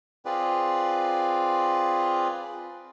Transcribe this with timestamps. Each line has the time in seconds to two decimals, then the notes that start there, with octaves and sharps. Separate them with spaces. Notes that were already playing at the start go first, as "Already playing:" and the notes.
0.26 C4 F4 G#4 B4 D5